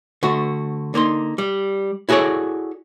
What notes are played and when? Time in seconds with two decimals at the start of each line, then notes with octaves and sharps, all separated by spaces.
0.23 D3 A3 F#4
0.94 D3 A#3 D#4 C6
1.38 G3
2.09 E4 F#4 G#4 A4 C#5 D5